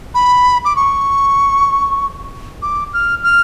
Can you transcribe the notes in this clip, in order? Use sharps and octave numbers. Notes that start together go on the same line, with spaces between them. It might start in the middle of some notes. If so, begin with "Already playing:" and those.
B5
D6
C#6
D6
F6
F6